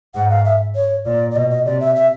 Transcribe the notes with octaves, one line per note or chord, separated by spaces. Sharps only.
G#2 F#5
F5
E5
C#5
A#2 D5
D5
B2 D#5
D#5
C3 D5
E5
E5